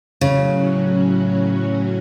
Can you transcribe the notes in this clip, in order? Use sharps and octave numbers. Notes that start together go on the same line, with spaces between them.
A2 C#3 F#3 C#4 F#4